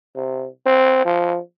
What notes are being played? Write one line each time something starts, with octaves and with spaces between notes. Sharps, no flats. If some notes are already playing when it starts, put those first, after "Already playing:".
C3
C4
F3